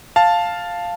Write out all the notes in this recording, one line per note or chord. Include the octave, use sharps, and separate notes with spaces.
F5 A5